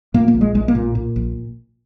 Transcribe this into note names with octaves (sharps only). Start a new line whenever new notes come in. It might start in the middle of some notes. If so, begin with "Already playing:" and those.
A#2 A#3
A#3
A#1
G#3
A#1 G#3
A#3
A#2
A#2
A#1